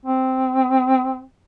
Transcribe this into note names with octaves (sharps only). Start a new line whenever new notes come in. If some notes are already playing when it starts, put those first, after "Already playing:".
C4